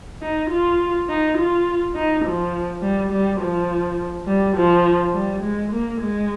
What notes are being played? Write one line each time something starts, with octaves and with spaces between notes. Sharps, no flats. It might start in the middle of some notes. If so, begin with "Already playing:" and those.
D#4
F4
D#4
F4
D#4
F3
G3
G3
F3
G3
F3
G3
G#3
A#3
G#3